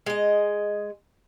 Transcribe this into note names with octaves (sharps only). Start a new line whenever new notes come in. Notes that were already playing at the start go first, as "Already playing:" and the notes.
G#3 D#5